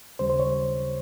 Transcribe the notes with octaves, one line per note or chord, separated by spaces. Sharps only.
D#2 C#3 G3 C5
C5
C#5